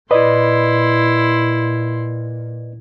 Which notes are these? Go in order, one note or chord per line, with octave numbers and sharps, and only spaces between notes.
A#2 E4 B4 D5 D#5 C6